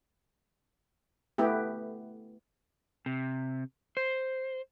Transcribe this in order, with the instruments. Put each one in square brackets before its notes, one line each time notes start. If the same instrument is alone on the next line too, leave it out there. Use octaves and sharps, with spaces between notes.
[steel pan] A3 B3 E4 G4
[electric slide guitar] C3
C5